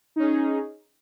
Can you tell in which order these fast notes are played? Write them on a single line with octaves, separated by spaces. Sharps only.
D#4 C#4 G#4